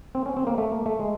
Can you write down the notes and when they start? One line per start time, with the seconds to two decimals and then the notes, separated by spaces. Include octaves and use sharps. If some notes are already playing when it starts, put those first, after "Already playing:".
0.15 C4
0.26 C#4
0.37 C4
0.47 A#3
0.58 A3
0.72 A#3
0.86 A3
0.99 G#3